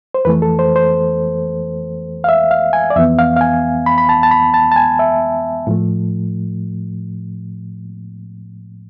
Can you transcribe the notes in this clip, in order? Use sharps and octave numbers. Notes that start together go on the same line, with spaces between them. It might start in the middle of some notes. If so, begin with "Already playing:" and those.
C5
F2 E3 A3 B4
A4
C5
C5
F5
E5
F5
G#5
D5
F2 E3 B3 E5
F5
F5
G#5
B5
B5
A5
A5
B5
A5
A5
G#5
E5
A2 F3 A3